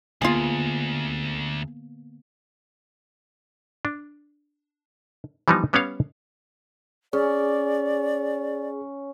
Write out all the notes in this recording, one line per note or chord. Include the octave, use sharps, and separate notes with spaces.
D2 D3 A#3 B3 F4 G#4
D4
E3 F3 G3 B3 D#4
G3 B3 C#4 B4 C#5 F5
C#4 G#4 D5